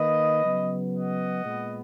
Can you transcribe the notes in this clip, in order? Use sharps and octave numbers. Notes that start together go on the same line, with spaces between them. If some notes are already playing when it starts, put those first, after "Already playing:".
Already playing: D#3 A#3 B4 D#5
C#3 F#3 B3
D#5 F#5
A#2 G#3 B3